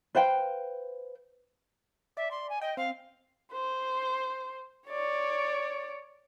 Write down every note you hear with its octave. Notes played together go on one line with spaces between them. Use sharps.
B4 C5 F5 G5
D5 E5
C6
G#5
D#5 G5
C4 F5
C5
C#5 D5